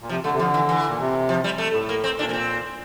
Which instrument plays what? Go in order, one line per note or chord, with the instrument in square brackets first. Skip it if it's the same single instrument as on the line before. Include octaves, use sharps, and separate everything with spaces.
[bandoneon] A#2
[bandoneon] C3 [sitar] F3
[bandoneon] D3 [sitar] A3
[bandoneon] C3
[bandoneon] D3 [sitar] F3
[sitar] E3
E3
[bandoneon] A#2
C3
[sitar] F3
G3
A3
[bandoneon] A2
[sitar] A#3
C4
[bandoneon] A#2 [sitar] D4
[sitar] A#3
C4